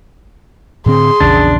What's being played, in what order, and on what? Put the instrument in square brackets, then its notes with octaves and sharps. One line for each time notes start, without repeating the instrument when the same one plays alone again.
[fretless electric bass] A2 D3 C4 [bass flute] G#4 [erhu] C6
[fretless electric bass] A#1 E2 C#3 [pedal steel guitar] D4